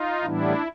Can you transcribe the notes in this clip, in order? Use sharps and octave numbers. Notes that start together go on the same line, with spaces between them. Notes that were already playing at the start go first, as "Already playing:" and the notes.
Already playing: D#4 F4
A2 E3 G3 B3 D4 E4